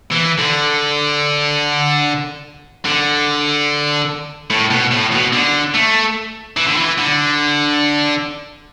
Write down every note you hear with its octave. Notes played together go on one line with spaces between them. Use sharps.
E3
D3
D3
A2
B2
A2
B2
D3
A3
E3
D3
E3
D3